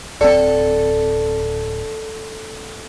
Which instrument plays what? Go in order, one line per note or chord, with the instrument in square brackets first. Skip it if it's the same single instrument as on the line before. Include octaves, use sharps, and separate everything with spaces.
[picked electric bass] D1 C4 [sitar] A4 [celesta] D5